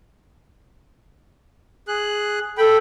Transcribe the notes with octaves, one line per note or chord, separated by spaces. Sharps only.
G#4 F#6
A4 G5 B5